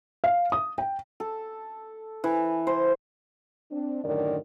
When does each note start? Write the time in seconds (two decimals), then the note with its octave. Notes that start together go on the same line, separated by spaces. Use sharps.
0.24 F5
0.52 D#6
0.78 G5
1.20 A4
2.24 E3
2.67 C5
3.71 C4 D4
4.04 F#2 A2 D3 D#3 A#4 D5